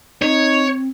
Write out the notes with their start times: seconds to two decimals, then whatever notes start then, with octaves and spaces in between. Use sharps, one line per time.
0.22 C4 D#4 C#5